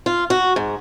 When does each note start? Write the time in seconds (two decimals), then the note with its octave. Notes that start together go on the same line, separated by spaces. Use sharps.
0.06 F4
0.30 F#4
0.56 G#2